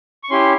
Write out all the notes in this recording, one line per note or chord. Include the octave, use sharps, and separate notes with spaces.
C#6
C#4 E4 G4 C6